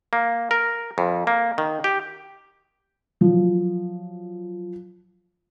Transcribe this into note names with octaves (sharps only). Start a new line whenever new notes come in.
A#3
A#4
F2
A#3
D#3
G4
F3 F#3